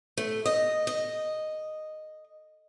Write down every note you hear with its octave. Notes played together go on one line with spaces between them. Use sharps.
A3
D#5
D#5